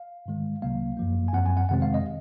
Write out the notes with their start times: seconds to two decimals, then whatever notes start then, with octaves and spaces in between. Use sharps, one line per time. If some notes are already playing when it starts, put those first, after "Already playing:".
Already playing: F5
0.26 G#2 D#3 G#3
0.62 C2 C3 F#3 A#3 F5
0.97 F#2 F3 A#3
1.28 G#5
1.33 F#2 F3 C4 F#5
1.46 G#5
1.57 F#5
1.69 F2 C3 D#3 G#3 C4 F#5
1.82 F5
1.94 D#5